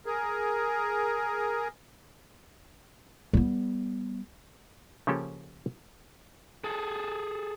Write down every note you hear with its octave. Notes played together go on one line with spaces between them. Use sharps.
G#4 A#4
G3 B3
C#3 F3 A#3 C#4 G4 A4
G#4 A4